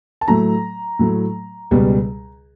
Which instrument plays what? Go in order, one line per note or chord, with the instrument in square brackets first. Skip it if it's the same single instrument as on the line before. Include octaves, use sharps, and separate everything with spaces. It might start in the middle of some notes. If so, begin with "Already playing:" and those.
[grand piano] A5
A2 F#3 A3 A#5
A2 F#3 A3
C#2 B2 G3